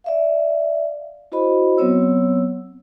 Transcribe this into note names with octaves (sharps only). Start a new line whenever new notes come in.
D5 E5 F5
E4 F#4 C5 D#5 B5
F#3 B3 C4 C#5 E6